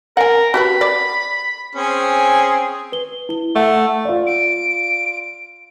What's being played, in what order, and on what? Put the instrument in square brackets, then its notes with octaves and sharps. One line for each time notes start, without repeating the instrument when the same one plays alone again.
[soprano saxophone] A#4 [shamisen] F#5 G#5
[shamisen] F#4 G4 B4 [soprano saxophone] B5
[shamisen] D5
[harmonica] C4 C#4 G#4
[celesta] B4 G7
E4 G7
[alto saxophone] A3 [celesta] E5 F#5
[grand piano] F4 D5
[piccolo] D7